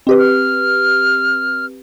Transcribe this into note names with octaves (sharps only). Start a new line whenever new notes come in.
C4 G4 B4 D#5
F6